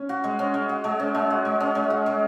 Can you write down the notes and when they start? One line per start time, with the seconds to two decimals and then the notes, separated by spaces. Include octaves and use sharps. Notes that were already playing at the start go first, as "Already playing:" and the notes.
Already playing: C#4
0.09 F#4
0.24 G#3
0.39 C#4
0.54 G#3
0.69 F#4
0.84 G#3
1.00 C#4
1.15 G#3
1.30 F#4
1.45 G#3
1.60 C#4
1.75 G#3
1.90 F#4
2.06 G#3